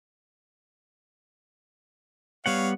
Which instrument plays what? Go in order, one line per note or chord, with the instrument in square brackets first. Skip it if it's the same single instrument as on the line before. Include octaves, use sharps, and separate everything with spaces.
[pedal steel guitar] G3 B3 F#5 [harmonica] C#5 F5